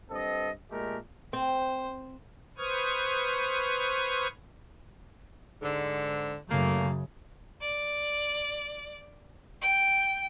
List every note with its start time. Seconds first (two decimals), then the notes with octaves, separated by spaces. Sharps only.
0.10 G2 C4 A4 D#5
0.71 A#2 G#3 A3 G4 A#4
1.33 C4 C5
2.58 B4 C5 C#6 D#6 F6 G#6
5.62 G#2 D3
6.50 F#2 C#3 A3 A#3
7.62 D5
9.62 G5